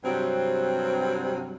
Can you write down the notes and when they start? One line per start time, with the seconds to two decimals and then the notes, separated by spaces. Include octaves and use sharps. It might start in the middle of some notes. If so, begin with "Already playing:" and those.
0.05 G2 C3 F#3 C4